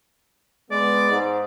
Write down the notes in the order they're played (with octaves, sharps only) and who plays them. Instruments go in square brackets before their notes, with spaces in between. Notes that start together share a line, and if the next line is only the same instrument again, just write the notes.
[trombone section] G#3 B3 [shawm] D5
[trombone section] G#2